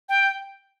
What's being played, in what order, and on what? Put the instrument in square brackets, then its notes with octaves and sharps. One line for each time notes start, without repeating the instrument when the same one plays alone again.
[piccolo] G5